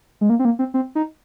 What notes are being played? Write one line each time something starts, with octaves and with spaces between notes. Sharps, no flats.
G#3
A#3
C4
A#3
C4
C4
D#4